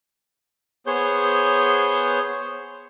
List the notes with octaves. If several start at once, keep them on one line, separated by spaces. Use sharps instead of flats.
B3 G#4 C5 C#5 G6